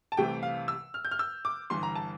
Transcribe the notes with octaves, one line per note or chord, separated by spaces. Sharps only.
A5
C2 C3 E3 A3 G5
F5
E6
F6
G6
F6
E6
D6
G1 G2 E3 C6
A#5
A5